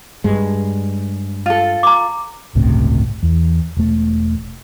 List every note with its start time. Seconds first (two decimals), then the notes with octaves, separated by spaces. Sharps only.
0.24 G2 G#3
1.46 F4 A4
1.83 A#5 D6
2.55 G1 C#2 A2 C3
3.23 E2
3.77 E1 A3